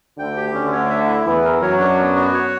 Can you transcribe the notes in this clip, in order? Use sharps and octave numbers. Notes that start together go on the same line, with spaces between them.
D2 D3 G5
G4
D2 D3 C#4
C#5
E5
E4
E2 E3 B3
A#4
F#2 F#3 C#5
D4
B3
F#4
C#5